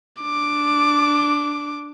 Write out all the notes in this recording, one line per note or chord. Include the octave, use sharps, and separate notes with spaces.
D4 D6